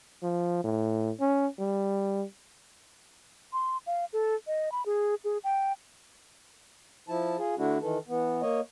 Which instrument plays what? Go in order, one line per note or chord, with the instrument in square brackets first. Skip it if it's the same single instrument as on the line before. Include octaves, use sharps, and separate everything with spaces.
[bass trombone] F3
A2
C#4
G3
[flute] C6
F5
A4
D#5
B5
G#4
G#4
G5
[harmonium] F3 E4 A5
F4 G#4
D3 A3 D4 E4 F#4
D#3 E3 A4
E3 B3
A#3 C#5 D#5